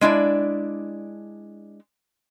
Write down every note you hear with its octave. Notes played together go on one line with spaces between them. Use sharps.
G#3 D4 E4 D5